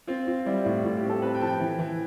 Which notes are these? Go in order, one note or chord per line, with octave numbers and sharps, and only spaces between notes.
C4 F4
C4 F4
G3 E4
A2 E4
A2 F4
G4
C4
A4
C4 B4
G5
F3 A5
G5
E3
E3